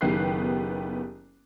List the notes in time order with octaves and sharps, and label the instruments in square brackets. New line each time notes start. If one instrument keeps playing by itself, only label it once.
[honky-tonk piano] F#1 D#3 B3 G4 F#6 C7